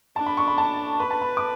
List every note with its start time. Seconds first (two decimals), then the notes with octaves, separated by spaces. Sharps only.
0.16 D4 A5
0.26 B5
0.37 C#6
0.48 B5
0.58 A5
1.00 B4 B5
1.11 A5
1.22 B5
1.37 D6